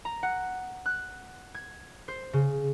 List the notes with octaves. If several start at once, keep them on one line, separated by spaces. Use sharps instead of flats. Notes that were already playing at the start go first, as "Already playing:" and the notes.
A#5
F#5
F#6
G#6
C5
C#3